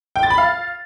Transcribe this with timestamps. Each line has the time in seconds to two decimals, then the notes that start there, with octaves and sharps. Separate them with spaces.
0.16 G5
0.23 A6
0.30 B5
0.38 F5